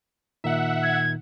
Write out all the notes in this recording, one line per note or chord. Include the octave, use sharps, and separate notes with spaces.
A#2 D#3 D#4 E5 F#5
G#6